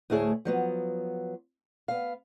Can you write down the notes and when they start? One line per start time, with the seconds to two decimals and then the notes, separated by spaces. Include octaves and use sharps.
0.10 D2 A2 A3 E4 G#4 C#5
0.45 F3 F#3 B3
1.88 B3 F5